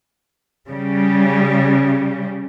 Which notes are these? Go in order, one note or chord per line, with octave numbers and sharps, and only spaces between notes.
C#3 G3